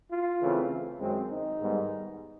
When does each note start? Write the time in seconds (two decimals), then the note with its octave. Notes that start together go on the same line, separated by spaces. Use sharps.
0.11 F4
0.41 C#3 E3 A3 C4
0.99 F#2 D#3 G#3 C4
1.30 D#4
1.59 G#2 D#3 G3 B3